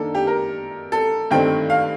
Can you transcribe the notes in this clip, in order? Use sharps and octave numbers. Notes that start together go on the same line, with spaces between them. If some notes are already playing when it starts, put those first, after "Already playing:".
Already playing: D#3 A#3 D4 A4
G4
A#4
A4
G2 D#3 A3 C4 G5
F5